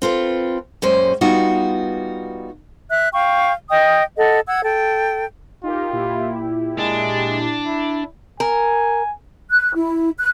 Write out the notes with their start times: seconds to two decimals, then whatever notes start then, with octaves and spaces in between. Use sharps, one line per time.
0.02 C4 F4 A4 B4
0.82 F#2 A#2 G3 G#3 C#4 C5
1.21 G3 B3 D#4 F4 F#4
2.90 E5 F#6
3.12 F5 G5 C#6
3.70 D#5 G5 D#6
4.17 A4 D#5 F#5
4.47 F#5 E6 G#6
4.63 A4 G5
5.64 D#4 F4 G4 A#4
5.93 A#2 E4 G4
6.78 G#3 D4
7.66 E4
8.40 A#4 G#5
9.51 F#6
9.75 E4
10.18 F#6